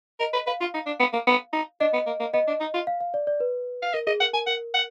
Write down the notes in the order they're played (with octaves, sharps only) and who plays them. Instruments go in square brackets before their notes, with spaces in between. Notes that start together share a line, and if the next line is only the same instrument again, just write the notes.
[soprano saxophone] A#4 [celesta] D#5
[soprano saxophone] B4
[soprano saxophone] B4 [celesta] F5
[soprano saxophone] F4
D#4
D4
B3
A#3
B3
D#4
[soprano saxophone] D4 [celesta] D#5
[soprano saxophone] B3
A#3
A#3
[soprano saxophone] B3 [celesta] D#5
[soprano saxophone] D4
D#4
F4
[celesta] F5
F5
D5
D5
B4
[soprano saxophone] F5
[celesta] A#4 [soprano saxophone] D#5
[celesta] G#4 [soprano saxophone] D#5
[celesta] A#4 [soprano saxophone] F#5
[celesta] A#4 [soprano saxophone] G#5
[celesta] A#4 [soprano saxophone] F#5
[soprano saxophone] F#5